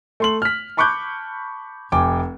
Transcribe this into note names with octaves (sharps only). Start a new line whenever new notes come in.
A3 C6 F#7
F6 B6
A5 B5 C#6 D6 F#6 G6
F1 G5 G#5 D6